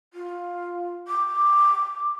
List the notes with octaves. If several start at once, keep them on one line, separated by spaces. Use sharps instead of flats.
F4
D6